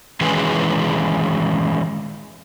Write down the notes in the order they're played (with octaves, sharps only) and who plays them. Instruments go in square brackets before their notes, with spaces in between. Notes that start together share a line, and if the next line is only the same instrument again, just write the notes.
[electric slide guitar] D#3 E3 G#3 C#4 G#4 B4